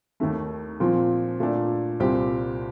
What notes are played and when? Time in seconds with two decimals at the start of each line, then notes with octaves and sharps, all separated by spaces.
0.20 D#2 D#3 A3
0.80 A#2 F3 C4
1.40 A#2 A3 D4
2.00 C2 A#2 G3 C4 G4